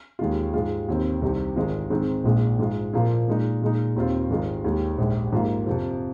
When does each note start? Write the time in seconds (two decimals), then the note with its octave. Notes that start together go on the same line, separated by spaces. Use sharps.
0.19 D#2 D#3 G#3 F4
0.54 G#2 G#3 F4
0.88 D#2 D#3 C4
1.22 C2 C3 D#3 C4
1.56 G#1 G#2 D#3 G#3 F4
1.90 G#2 D#3 G#3 C4
2.24 A#1 A#2 G#3 D#4
2.59 G#2 G#3 F4
2.93 A#2 F3 A#3 F4
3.28 A#2 G#3 D#4
3.61 A#2 G#3 D#4
3.96 D#2 D#3 C4 F4
4.30 G#1 G#2 D#3 G#3 F4
4.64 D#2 D#3 G#3
4.98 A#1 G#2 G#3
5.32 G#2 F3 A#3 F4
5.66 F2 C3 F3